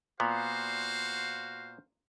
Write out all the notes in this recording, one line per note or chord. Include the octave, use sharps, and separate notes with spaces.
A#2 B3 F#4 C5 F5